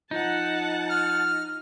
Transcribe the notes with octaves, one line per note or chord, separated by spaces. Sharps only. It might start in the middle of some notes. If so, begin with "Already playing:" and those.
F3 D#4 F#5 A5
F6